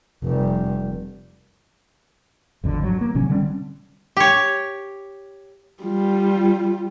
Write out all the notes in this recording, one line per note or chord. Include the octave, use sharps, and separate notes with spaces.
F1 G3
G#1 F2 D3
F#3
A#3
A1 C3 F#3 C#4
D3 G3 C4 C#4
G4 C#5
G3 F4